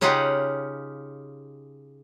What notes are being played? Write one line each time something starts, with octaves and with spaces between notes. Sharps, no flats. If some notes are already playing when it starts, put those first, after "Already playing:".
C#3 C#4 D#4 F4 G4 F#5